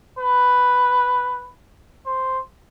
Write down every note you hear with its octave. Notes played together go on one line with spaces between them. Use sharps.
B4
C5